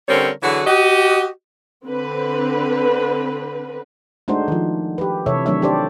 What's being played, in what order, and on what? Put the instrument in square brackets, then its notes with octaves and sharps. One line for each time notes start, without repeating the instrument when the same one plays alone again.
[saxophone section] D3 G3 C4 C#4 A#4 C#5
D3 E3 F#3 F#4 G#4 B4
F#4 G4 D#5
[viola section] D3 C4 B4
[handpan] G#3 A3 D4 D#4 F#4 C5
D#3 F3
G4 B4
C3 E3 A4 C#5 E5
D#3 F#3 A3 D4 C#5 E5
D4 G4 A4 C5 D5